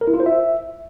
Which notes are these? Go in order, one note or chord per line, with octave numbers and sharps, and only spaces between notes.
A#4
E4
F4
C5
E5